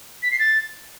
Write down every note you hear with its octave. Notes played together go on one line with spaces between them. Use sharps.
B6
C7
A6